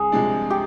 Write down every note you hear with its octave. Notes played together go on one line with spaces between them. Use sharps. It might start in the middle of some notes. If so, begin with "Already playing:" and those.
Already playing: C2 G#4
C3 F3 G#3 D4
G4